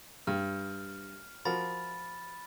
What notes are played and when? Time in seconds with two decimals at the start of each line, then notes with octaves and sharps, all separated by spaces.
0.27 G2 F6
1.45 F3 F#4 A#4 B5 A6